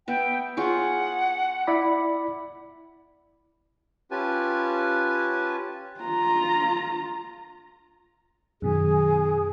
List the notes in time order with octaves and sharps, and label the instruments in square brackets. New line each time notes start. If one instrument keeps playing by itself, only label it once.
[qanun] B3 E5 [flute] G5
[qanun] F4 G#4 C#5 [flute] F#5
[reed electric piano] E4 D5 B5
[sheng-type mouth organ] C#4 F4 G4 B4 G#5 A5
[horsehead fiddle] F4 A#5
[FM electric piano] F#2 B2 D#3 [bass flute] G#4